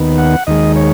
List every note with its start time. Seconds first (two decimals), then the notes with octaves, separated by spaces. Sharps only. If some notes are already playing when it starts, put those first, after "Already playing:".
Already playing: D#2 D#3 B3
0.18 F#5
0.47 D#2 D#3 G#3 D#5
0.76 C#5